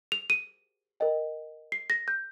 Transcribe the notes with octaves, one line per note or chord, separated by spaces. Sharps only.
F7
D#7
A#4 D#5 G5
C7
A#6
G6